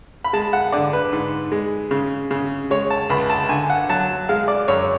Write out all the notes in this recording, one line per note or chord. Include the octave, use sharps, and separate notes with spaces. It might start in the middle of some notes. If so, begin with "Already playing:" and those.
B5
G#3 A5
F#5
D3 D5
B4
G#2
G#3
C#3
C#3
G#3 C#5
A5
C#2 B5
A5
D3 G#5
F#5
F#3 A5
G#3 F5
D5
F#2 C#5